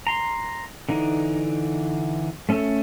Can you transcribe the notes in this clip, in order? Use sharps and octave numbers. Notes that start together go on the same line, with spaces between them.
A#5 C6
D3 E3 D#4
A3 C#4 A4 E5